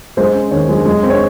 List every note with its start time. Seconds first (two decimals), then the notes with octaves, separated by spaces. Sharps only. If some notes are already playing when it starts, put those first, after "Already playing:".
0.17 G#3 C5
0.35 C#4
0.51 D#2 C#5
0.69 G#3
0.86 G#3
1.03 C4
1.10 C#5